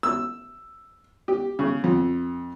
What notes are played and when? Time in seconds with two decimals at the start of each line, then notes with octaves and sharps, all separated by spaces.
0.03 E6
1.28 G4
1.59 C#3
1.84 F2